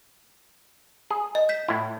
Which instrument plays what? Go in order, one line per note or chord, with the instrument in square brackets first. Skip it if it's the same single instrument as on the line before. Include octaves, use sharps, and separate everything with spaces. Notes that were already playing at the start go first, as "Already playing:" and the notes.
[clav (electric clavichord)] G#4
[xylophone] D#5
G6 B6
[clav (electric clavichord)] A2 E4